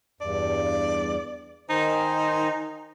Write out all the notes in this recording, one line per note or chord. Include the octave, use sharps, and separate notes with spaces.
E2 G2 D5
D#3 D#4 C5 G#5